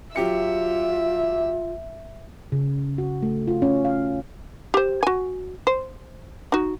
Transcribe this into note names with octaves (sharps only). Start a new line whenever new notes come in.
F#3 F4 G4 E5 C#7
C#3
F#4
A3
F4
C#4
F5
G4 C5
F#4 G#5
C5
D#4 F#4